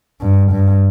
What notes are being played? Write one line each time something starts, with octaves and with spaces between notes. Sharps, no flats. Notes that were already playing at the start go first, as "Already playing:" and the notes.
G2
G2